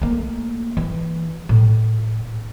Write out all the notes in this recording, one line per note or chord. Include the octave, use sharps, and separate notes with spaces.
A3 A#3
E3
A2